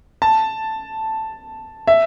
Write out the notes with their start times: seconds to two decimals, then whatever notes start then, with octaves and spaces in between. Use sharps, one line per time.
0.22 A5
1.87 E5